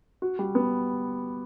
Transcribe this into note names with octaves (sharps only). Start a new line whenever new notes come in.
F#4
G3
B3